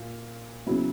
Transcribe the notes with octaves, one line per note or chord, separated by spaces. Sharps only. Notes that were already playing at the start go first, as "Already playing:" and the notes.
Already playing: A#2 F4
C#3 F#3 B3 E4